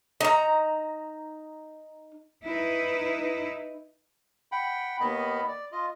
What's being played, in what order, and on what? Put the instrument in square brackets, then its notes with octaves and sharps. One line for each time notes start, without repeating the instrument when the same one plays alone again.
[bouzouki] D#4 A#5
[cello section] D#4 E4 B4
[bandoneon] F#5 G5 B5
D#2 D#3 B3 D#5 B5
D5
F4 D#5